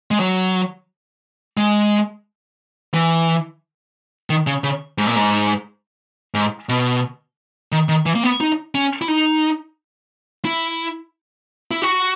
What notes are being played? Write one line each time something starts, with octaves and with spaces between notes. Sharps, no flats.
G#3
F#3
G#3
E3
D#3
C#3
C#3
G#2
A#2
G#2
G#2
B2
D#3
D#3
E3
A#3
B3
D#4
C#4
E4
D#4
E4
E4
F#4